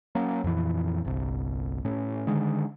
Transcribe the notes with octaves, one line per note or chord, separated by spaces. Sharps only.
F#3 A#3 C#4
F2 A#2 E3
G1 C2
A2 C#4
D3 D#3 G#3